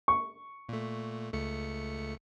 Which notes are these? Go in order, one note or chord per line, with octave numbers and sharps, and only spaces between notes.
C#6
A#2 A3
C#2 A3 C#7